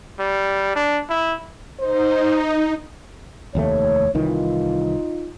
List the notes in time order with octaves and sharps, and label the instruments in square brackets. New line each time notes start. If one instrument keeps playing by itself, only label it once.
[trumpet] G3
D4
E4
[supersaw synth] D#4 [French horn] C5
[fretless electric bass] F1 D#2 A3 [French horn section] C#5
[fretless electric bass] C2 D#3 E3 [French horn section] D#4 F4